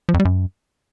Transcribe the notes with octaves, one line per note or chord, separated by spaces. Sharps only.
F3
F2
G3
F#2